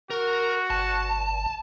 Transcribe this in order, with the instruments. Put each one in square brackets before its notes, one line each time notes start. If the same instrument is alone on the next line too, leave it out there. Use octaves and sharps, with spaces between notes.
[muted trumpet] F#4 [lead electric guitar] A#4
[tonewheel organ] G1 [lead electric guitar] A5